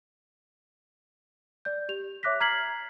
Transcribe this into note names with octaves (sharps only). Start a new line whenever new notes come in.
D5 G6
G4 F7
C#5 E5 D6 F#6 A#6 B6
A#5 F6 G#6 B6 C7 F#7